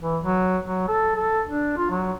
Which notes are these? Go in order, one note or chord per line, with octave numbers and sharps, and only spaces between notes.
E3
F#3
F#3
A4
A4
D4
F4
F#3